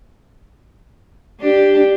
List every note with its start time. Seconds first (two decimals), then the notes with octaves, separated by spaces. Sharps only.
1.41 D4 G4